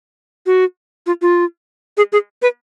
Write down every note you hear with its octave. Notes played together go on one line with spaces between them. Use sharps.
F#4
F4
F4
G#4
G#4
B4